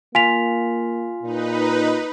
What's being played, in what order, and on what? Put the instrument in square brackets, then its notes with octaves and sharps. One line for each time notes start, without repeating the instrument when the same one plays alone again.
[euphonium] A#3 [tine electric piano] F4 [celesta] G#5 B6 F7
[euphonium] A#2 [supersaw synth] D#4 B4